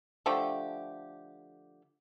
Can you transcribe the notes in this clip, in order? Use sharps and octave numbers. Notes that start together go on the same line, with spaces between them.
D3 F3 A3 G4